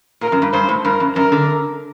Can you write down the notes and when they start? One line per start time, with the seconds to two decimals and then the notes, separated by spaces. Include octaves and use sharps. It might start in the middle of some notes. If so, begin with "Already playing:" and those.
0.21 A#2 A#4
0.32 F#2
0.42 G2
0.53 G2 C5
0.69 A2
0.85 G2 A#4
1.00 F#2
1.16 F#2 A#4
1.32 D3